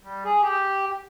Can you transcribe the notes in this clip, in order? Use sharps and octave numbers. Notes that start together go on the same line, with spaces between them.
G3
G#4
G4